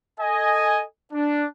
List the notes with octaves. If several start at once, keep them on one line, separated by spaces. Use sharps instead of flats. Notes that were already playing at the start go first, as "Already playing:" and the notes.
A4 D#5 G#5
D4